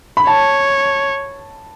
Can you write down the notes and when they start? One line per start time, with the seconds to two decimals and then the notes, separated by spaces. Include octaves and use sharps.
0.17 B5
0.27 C#5 A5